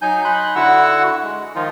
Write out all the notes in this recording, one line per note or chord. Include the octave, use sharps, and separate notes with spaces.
F#3 D#4 G#5 G6
D#4 B5 C6 F#6
D3 E4 F#4 F#5 C#6 E6
G#3
D#3 F3 D#4 F4